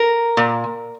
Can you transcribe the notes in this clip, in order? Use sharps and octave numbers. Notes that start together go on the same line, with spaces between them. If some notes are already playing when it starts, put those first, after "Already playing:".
Already playing: A#4
A#2